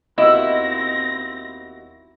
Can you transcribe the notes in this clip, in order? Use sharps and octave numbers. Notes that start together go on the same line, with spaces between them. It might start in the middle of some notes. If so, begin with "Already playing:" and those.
D#2 B2 C4 E4 D#5 A#6